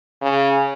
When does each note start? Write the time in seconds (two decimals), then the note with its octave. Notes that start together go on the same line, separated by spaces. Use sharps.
0.22 C#3